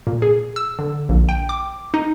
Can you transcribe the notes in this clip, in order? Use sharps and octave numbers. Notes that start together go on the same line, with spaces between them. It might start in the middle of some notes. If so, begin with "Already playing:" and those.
A#2
G#4
E6
D3
A#1
G5
D6
D#4